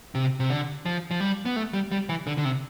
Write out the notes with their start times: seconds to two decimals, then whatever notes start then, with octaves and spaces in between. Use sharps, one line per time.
0.15 C3
0.40 C3
0.50 D3
0.86 F3
1.11 F3
1.21 G3
1.45 B3
1.56 A3
1.73 G3
1.92 G3
2.09 E3
2.27 D3
2.38 D3
2.45 C3